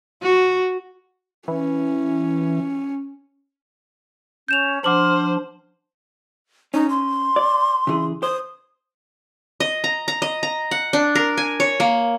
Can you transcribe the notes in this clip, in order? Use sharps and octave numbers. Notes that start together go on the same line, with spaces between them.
F#4
E3 C#4
C#4 G6 E7 F7
F3 D4 C5 F#5 D6 F6 F#7
C#4 D#4
C6
D5
C#3 E3 G#4
C5 D#6
D#5
A#5
A#5
D#5
A#5
F#5
D4
A#4
G#5
C#5
A#3